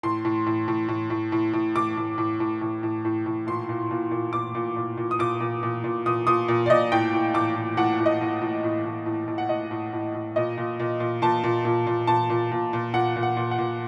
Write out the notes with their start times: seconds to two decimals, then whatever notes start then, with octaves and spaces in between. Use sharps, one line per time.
0.03 A2 C6
0.25 A2
0.47 A2
0.68 A2
0.88 A2
1.10 A2
1.32 A2
1.53 A2
1.76 A2 D6
1.97 A2
2.18 A2
2.40 A2
2.61 A2
2.83 A2
3.05 A2
3.26 A2
3.47 A#2 C6
3.69 A#2
3.91 A#2
4.11 A#2
4.33 A#2 D6
4.55 A#2
4.76 A#2
4.97 A#2
5.11 D#6
5.19 A#2 D6
5.40 A#2
5.63 A#2
5.84 A#2
6.06 A#2 D#6
6.27 A#2 D#6
6.48 A#2
6.66 D5
6.69 A#2 D#5
6.92 A2 G5
7.13 A2
7.34 A2 D6
7.56 A2
7.77 A2 F#5
8.00 A2
8.06 D#5
8.21 A2
8.42 A2
8.64 A2
8.85 A2
9.06 A2
9.28 A2
9.38 F#5
9.49 A2 D#5
9.71 A2
9.93 A2
10.14 A2
10.36 A#2 D#5
10.57 A#2
10.79 A#2
11.00 A#2
11.22 A#2 A5
11.44 A#2
11.65 A#2
11.87 A#2
12.07 A#2 A5
12.30 A#2
12.51 A#2
12.73 A#2
12.93 A#2 F#5
13.16 A#2
13.23 F#5
13.37 A#2
13.51 F#5
13.58 A#2